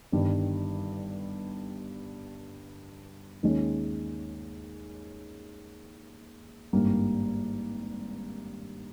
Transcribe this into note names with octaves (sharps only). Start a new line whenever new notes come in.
G1 G2 D#3 G3
D#2 D#3 G#3 C#4
G#1 G2 G3 A#3